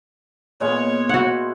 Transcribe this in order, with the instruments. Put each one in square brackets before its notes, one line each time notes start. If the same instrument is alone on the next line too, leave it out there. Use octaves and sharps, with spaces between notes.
[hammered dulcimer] A#2 G#3 B3 [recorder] C#5
[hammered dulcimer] E4 C5 [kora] F#4 F#5